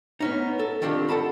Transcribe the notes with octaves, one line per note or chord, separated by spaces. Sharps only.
B3 C#4 D#4
A4
D#3 C4 D4 F4 G4
A4 F#5 A5 B5